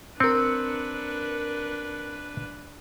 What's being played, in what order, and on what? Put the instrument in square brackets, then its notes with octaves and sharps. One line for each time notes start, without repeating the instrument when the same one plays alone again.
[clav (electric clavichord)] C4 [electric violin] D4 B4 [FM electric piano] A#4 C#7